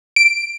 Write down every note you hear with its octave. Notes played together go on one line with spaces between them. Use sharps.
D7